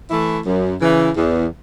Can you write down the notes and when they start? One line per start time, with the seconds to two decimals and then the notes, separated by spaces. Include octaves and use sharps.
0.10 E3 A3 E4
0.46 F#2
0.81 C#3 E3
1.17 E2